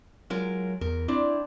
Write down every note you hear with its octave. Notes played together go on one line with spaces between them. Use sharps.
F#3 G#3 F4 A#4
E2 A#4
C4 D4 E4